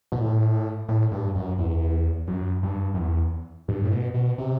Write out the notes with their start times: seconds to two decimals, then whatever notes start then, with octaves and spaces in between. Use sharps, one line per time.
0.12 B2
0.19 A2
0.89 A2
1.12 G2
1.35 F#2
1.58 E2
2.28 F#2
2.63 G2
2.94 F#2
2.98 E2
3.68 G2
3.83 A2
3.91 B2
4.14 B2
4.38 C3